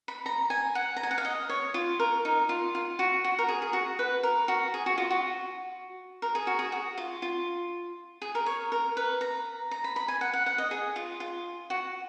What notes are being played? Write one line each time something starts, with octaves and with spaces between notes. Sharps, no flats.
B5
A#5
G#5
F#5
A#5
G#5
F#5
F5
D#5
C#5
F4
A#4
D#4
F4
F4
F#4
F#4
A#4
G#4
G#4
F#4
B4
A#4
F#4
G#4
F#4
F4
F#4
A#4
G#4
F#4
G#4
F#4
F4
F4
G#4
A#4
C#5
A#4
B4
A#5
A#5
B5
B5
G#5
F#5
F#5
F#5
D#5
G#4
F4
F4
F#4